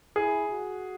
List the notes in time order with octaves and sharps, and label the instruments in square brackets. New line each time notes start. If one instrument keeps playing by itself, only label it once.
[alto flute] E4 [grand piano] G#4
[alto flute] F#4